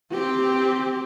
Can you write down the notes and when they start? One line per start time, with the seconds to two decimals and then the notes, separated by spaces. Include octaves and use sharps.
0.11 C4 G4